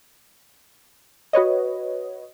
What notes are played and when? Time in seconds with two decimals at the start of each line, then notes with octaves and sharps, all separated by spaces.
1.33 F#4 B4 C#5 D#5